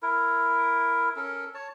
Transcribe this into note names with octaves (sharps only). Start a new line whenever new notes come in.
E4 A#4
C#4 A4 A#4
C#5 A5